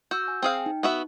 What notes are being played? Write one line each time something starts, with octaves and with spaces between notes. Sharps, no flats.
F#4 E6 G6
G#5
C4 G#4 F5 G5
D#4
B3 F#4 E5